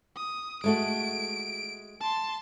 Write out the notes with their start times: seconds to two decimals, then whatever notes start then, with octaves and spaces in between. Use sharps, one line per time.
0.16 D#6
0.64 G#3 A3 F#4 D7
2.01 A5 C6